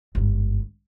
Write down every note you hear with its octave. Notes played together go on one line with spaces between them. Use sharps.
G1 G#2